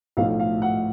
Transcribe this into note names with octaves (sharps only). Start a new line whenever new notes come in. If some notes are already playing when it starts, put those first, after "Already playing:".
B1 A2 F3 A3 F5
F5
F#5